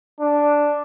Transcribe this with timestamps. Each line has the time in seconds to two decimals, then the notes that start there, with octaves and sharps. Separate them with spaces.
0.21 D4